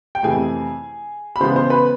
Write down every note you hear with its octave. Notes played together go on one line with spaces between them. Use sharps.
G5
F2 C3 E3 A3 G#4 G#5
B5
C#3 E3 G#3 B3 C5 C6
C5 C6
B4 B5